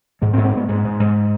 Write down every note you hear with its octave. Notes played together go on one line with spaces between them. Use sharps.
G#2 G#3
C4
G#2
C4
G#2 B3
G#2 G#3
G#2
G#2